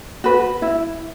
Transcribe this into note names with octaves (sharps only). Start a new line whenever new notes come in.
F#4 B4
E4